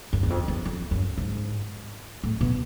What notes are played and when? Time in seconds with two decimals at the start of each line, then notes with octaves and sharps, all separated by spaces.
0.13 F#2
0.23 E2
0.30 F2
0.48 E2
0.65 F2
0.91 F#2
1.18 G#2
2.24 A2
2.41 B2